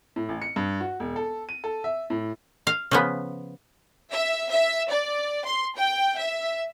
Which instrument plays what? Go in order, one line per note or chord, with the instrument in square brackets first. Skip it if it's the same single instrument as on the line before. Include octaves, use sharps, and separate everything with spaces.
[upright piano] A2
A1
C#7
G2
F#4
E1
A4
D#7
A4
E5
A2
[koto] F5
C#3 F3 B3
[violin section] E5
E5
D5
C6
G5
E5